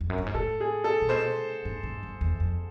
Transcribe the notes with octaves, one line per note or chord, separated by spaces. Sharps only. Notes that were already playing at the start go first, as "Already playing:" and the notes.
F2
F#2
G2
G#2
A2 A4
G#4
A4
A#2
B2 C5
G#2
G2
F#2
E2
F2